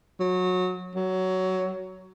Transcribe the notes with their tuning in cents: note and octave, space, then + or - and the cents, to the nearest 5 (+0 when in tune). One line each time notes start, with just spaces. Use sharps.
F#3 -20
F#3 +15